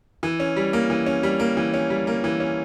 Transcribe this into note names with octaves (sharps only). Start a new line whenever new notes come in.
E3
C#4
G3
A#3
E3
C#4
G3
A#3
E3
C#4
G3
A#3
E3
C#4